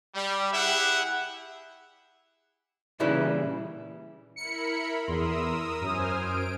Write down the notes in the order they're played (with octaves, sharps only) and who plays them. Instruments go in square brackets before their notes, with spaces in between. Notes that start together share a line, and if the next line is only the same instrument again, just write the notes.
[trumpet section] G3
E4 G4 G#4 E5 F#5
[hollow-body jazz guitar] A#2 C#3 E3 G3 E4
[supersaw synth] E4 A#4 B5 [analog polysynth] C#7
[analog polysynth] E2 C6 [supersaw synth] A#4 D#6 E6
[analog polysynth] F#2 D#6 [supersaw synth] C5 G#5 F6
[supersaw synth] D7